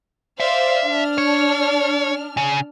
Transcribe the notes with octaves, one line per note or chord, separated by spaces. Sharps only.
C5 D5 E5 F5
D4 F6
C#5
C#3